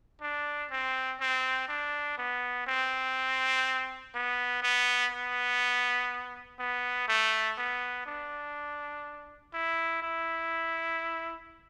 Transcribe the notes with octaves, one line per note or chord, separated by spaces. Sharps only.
D4
C4
C4
D4
B3
C4
B3
B3
B3
B3
A3
B3
D4
E4
E4